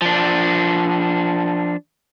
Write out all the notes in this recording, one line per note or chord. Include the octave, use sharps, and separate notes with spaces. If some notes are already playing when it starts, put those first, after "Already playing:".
F3 D4